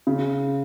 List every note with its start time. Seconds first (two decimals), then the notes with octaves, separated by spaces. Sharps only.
0.07 C#3